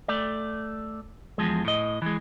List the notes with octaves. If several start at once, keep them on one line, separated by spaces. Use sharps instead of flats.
A3 D5
E2 F3 G#3
A2 D#5
E3 G#3